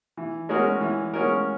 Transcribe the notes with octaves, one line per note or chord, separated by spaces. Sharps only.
E3
G#3 C#4 F#4 A#4
E3
G#3 C#4 F#4 A#4